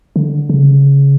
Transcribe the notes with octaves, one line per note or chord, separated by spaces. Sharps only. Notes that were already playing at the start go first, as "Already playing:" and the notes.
D3
C#3